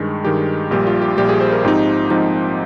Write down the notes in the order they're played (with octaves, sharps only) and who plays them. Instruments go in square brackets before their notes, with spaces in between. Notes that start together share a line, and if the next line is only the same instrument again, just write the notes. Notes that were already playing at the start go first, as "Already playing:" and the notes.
Already playing: [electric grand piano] G2 D#3 G#3
G2 D#3 G#3 G4
A#1 A#2 G3 G4
F4
G4
A#1 A#2 G3 G4
G#4
C5
A#4
G#2 F3 C4 D#4 G4
G#2 F3 C4 D#4